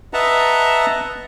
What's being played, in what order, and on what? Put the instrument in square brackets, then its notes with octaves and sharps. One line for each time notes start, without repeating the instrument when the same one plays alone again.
[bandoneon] B4 D#5 E5 F#5 A5 A#5